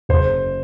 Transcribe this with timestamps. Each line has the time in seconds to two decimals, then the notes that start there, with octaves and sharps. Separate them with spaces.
0.09 F#1 C5